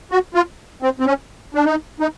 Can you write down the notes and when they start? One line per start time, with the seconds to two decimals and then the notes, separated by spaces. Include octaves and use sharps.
0.12 F#4
0.35 F4
0.83 C4
1.00 C4
1.06 C#4
1.55 D4
1.65 D#4
2.00 D#4